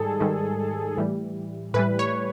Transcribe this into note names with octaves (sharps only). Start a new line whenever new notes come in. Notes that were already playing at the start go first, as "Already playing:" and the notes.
Already playing: G#2 D#3 G3 G#4 A4
G#2 D#3 G3
A2 E3 G3
A2 E3 G3 B4
C#5